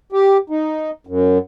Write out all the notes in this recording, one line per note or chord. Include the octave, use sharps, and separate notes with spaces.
G4
D#4
F#2